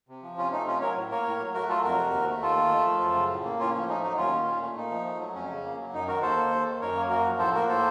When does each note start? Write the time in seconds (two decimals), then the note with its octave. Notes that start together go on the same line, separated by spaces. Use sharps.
0.09 C3
0.23 F3
0.37 C3 C#4 F4
0.52 A3 D#4
0.67 C3 C#4 F4
0.81 F#3 A#4 C#5
0.97 A2
1.10 A#3 A#4 C#5
1.26 A2
1.40 F#3
1.54 A3 F#4 A#4
1.69 F#3 F4 A4
1.84 F2 F#4 A#4
1.98 C3
2.13 D#2
2.28 A3
2.42 D#2 F4 A4
2.57 D#3
2.72 A3
2.86 F3
3.01 F#2
3.15 C#3
3.30 A2
3.44 A#3
3.59 A2 C#4 F4
3.73 F3 C#4
3.88 A3 D#4
4.03 F#3 D#4
4.17 D#2 C#4 F4
4.32 D#3
4.47 A#2
4.61 A3
4.76 A#2 D#4
4.90 F3
5.05 A3
5.20 F#3
5.35 F2 C#4
5.50 C#3
5.64 A#3
5.79 F#3
5.94 F#2 D#4
6.08 D#3 F#4 A#4
6.22 D#2 A4 C5
6.37 A#3
6.52 D#2
6.66 D#3
6.81 F#2 A#4 C#5
6.95 A#3
7.10 F#2 F#4 A#4
7.25 F3
7.39 A2 A4 C5
7.54 A#3 F#4 A#4
7.68 A2 A4 C5